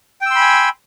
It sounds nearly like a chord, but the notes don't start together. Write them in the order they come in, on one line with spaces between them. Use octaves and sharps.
G5 E6 C6 B5 G#5